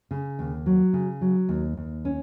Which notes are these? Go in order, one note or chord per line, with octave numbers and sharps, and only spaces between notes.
C#3
D#2
F#3
C#3
F#3
D#2
D#2
C#4